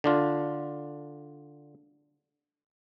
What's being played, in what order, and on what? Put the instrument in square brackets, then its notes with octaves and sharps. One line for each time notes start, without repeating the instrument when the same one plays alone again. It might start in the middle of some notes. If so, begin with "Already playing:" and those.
[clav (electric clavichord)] D3 D4 F4